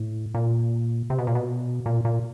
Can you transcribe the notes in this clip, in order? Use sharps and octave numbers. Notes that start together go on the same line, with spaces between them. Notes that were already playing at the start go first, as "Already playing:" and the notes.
Already playing: A2
A#2
C3
B2
A#2
B2
A#2
A#2